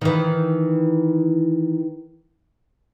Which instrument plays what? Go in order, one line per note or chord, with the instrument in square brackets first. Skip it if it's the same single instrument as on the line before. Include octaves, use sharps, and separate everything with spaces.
[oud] D#3 E3